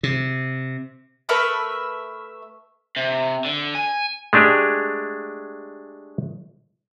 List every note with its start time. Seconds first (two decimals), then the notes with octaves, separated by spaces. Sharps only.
0.03 C3
1.29 A3 A#4 B4 E5
2.96 C3
3.45 D3
3.75 G#5
4.33 G#3 A3 D4 G4 G#4